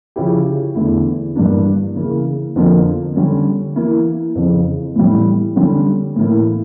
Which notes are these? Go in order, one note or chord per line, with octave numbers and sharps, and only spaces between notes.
C#3 F3 C#4 E4 G4
E2 D3 A3 E4
G2 E3 A#3 D4
C#3 E3 A#3
F2 D3 F3 A#3
D3 G3 C#4
E3 A#3 E4
F2 C#3 E3
A2 E3 G3
D3 G3 C#4
A2 E3 A#3 E4